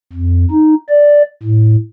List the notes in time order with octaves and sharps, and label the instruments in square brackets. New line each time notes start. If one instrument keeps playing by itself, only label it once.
[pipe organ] F2
D#4
D5
A2